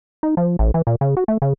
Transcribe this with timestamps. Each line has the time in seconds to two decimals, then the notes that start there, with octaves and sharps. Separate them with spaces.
0.23 D#4
0.37 F3
0.59 A1
0.74 E3
0.87 A#2
1.01 C#3
1.17 F#4
1.28 A3
1.42 C#3